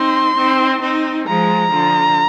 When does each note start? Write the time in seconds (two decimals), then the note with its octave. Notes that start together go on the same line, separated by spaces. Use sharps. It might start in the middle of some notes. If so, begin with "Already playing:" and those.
Already playing: C4 D#4 C6
0.37 C4 D#4
0.81 C4 D#4
1.27 F3 G#3 A#5
1.72 D3 F3